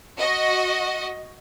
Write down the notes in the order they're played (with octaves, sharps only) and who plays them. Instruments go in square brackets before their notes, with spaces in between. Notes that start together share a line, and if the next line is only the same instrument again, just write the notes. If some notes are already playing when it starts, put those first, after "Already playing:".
[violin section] F#4 D#5